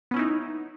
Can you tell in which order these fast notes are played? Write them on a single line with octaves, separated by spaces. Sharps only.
B3 C#4 E4 D#4